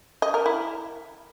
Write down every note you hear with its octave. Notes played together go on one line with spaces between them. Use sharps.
D#5
A#4
E4